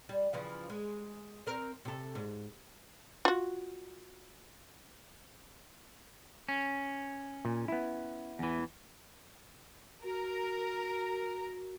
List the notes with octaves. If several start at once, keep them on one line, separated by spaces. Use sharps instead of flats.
G3
C#3 E3 F3
G#3
C4 A#4
C3 A4
G#2
F4 F#4
C#4
A#2
B3 E4
E2 E3
F#4 A#4